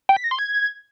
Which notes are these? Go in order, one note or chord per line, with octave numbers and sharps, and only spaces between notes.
G5
B6
A#6
C6
G#6